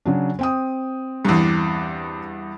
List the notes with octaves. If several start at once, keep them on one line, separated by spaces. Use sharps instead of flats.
C#3 F#3 D4
C4 G5 D#6
E2 G2